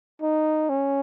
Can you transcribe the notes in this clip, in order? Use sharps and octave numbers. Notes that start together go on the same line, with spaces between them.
D#4
C#4